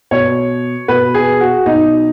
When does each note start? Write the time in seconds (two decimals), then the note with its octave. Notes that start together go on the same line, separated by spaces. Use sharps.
0.11 B2 C#5
0.88 B2 B4
1.14 G#4
1.40 F#4
1.66 B2 D#4